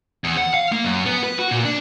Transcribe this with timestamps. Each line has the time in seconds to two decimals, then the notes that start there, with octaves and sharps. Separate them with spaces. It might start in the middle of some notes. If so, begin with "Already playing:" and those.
0.24 E2
0.38 F#5
0.54 F5
0.72 A#3
0.84 F#2
1.06 B3
1.24 B4
1.39 F#4
1.51 A#2
1.65 D4